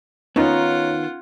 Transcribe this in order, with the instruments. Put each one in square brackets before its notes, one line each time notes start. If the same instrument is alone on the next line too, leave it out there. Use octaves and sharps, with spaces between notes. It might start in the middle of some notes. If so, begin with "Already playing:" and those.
[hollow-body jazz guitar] D#3 B3 [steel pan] C#4 D#4 [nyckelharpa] F4 F#5 [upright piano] C#5 A#5